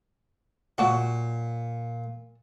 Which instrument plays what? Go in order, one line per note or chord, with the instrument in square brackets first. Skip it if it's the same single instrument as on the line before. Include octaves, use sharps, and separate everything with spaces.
[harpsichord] A#2 [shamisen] F#3 F#4 F#5